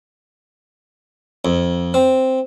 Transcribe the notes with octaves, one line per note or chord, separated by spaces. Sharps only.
F2
C4